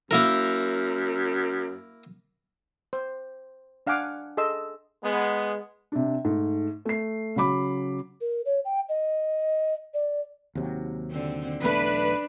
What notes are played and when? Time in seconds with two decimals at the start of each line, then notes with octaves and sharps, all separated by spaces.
0.11 F#2 A#3 E4 A#4
2.93 C5
3.87 D4 F5 F#5 G#5 D6
4.37 G#4 A4 D#5 C6 E6
5.04 G#3 B3
5.92 C3 D4
6.25 G#2 A3
6.85 A3 C7
7.36 C#3 F#3 B5 D6
8.21 A#4
8.46 C#5
8.65 G5
8.89 D#5
9.94 D5
10.55 D#2 C3 F#3
11.11 D3 C4
11.63 B1 E2 A3 D4 B4